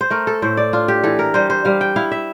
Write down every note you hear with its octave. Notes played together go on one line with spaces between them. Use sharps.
C5
A3 A#4
A4
A2 C5
D5
D4 F4
G4
E3 A4
A#4
G3 C5
C5
G3 F5
G5
E4 F5
E5